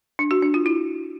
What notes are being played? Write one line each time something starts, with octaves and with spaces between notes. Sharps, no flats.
D4
F#4
D4
F4
E4